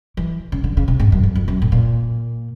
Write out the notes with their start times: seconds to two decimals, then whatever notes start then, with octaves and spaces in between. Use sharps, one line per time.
0.17 E3
0.52 C#3
0.64 D3
0.77 C#3
0.88 C3
1.00 G#2
1.12 F#2
1.24 F2
1.35 F2
1.48 F#2
1.62 A2
1.72 A#2